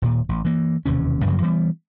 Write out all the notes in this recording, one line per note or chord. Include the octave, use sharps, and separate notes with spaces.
D#1 A#2
A1
E3 A#3
E1 D#2 C3 C#4
F#2 C#3 F3 F#3
E3 G3 B3